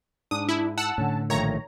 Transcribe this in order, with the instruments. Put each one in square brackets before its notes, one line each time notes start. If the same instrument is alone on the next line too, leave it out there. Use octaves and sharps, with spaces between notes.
[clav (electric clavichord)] G#2 [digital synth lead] D4 [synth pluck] D#6
[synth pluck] E4
[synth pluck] F#5 E6 [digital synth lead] A5
[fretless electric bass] A2 D3 [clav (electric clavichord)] C#4
[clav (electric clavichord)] A#1 A3 F4 [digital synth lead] D#3 [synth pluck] C#5 A#5